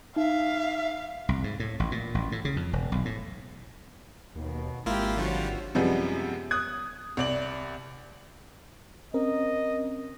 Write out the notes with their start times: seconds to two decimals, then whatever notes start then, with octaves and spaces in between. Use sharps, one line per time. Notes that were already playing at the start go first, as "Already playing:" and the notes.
0.16 D#4 E5 F5
1.29 C2
1.44 G#2
1.60 A2
1.80 A1
1.92 A#2
2.15 A1
2.32 A2
2.45 C#3
2.56 F2
2.73 E1
2.92 B1
3.05 A2
4.36 D#2 B2
4.86 G#1 G#3 A#3 E4 F4 G4
5.18 D3 F3 G3 F4 F#4 C#5
5.75 F#2 C3 F3 G3 G#3 B3
6.51 D#6 F#6 G#6
7.17 C2 D5 F#7
9.14 C4 C#4 A#4 D#5